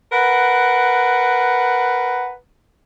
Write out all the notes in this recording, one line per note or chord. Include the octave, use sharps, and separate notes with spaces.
A#4 B4 F#5